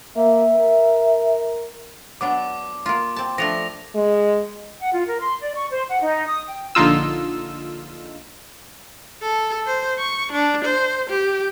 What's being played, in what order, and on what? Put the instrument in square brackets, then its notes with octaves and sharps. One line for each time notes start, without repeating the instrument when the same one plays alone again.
[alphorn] A#3 [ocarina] E5
[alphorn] A#4
[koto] F#3 B3 D4 [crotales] D6
[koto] A#3 F4
C4 A5
[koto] F3 A3 D4 [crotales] A#6 F7
[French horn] G#3
[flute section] F#5
F4
A#4
C6
D5
C#6
C5
F#5
D#4
D#6
G5
[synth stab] A#1 D3 D#4 F4 E6
[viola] A4
C5
C#6
D4
C5
G4